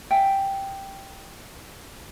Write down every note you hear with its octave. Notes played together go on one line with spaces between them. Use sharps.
E5 G5 G#5